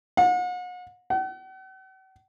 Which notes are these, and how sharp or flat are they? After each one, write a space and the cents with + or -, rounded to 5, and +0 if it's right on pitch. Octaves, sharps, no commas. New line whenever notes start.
F#5 -40
F#5 +45